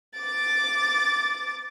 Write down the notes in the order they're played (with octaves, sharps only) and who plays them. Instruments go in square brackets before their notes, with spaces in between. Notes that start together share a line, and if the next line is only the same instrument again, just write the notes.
[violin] D6 A6